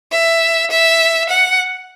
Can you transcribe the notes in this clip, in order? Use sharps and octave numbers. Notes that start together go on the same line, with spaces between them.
E5
E5
F#5